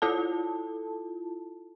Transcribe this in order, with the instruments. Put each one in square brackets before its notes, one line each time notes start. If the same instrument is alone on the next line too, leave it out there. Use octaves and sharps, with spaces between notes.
[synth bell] E4 F4 A4 A5